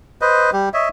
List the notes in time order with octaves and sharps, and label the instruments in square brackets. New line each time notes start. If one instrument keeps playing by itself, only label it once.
[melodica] B4 C5 D#5
G3 G4
C#5 D#5 E5